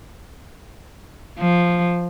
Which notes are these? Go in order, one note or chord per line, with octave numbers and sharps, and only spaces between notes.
F3